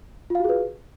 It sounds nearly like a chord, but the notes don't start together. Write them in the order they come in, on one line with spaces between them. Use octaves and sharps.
F4 F5 F#4 G#4 B4